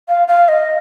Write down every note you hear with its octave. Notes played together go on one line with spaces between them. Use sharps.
F5
F5
D#5